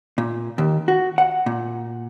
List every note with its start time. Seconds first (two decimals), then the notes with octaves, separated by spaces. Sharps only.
0.18 A#2
0.58 D#2
0.88 F#4
1.18 F#5
1.46 A#2